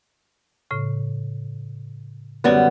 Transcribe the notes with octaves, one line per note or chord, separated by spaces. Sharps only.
A2 C#3
F#2 D3 F#3 G3 B3 F#4